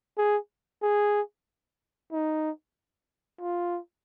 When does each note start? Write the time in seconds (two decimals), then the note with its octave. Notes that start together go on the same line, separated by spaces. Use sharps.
0.18 G#4
0.82 G#4
2.12 D#4
3.40 F4